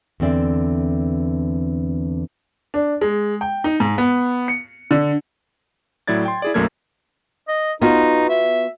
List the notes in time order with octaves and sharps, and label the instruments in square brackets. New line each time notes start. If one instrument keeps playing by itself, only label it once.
[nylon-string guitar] E2 D3 C4 D5 E5
[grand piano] D4
G#3
G5
D#4
G#2
B3
C#7
D3
[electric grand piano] A2 F#3 E4 D5 G#6 A6
G5 C6
E4 G#4 D5
B1 F#2 A3 A#3 A#4 G#6
[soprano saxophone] D#5
[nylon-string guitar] B3 F4 F#4 [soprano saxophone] D#4
[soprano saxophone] E5